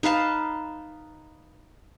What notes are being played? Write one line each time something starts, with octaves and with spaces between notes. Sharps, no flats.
D#4 B4 F5 A5